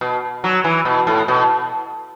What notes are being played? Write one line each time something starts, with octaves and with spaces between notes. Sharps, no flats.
B2
F#3
E3
B2
A2
B2